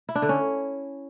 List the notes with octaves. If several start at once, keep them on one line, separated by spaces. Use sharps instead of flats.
E4
D4
D3
C#4